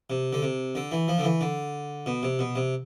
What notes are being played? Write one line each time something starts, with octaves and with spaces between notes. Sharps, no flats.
C3
D3
C3
D3
E3
F3
D3
E3
D3
B2
C3
B2
C3